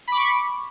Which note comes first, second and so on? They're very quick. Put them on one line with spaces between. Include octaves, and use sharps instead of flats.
B5 D6 C#6